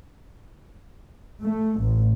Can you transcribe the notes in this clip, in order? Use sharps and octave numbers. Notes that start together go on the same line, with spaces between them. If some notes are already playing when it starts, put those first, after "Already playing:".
A3
A1